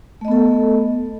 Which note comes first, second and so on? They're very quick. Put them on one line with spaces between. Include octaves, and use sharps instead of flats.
A3 D#5 B3 A4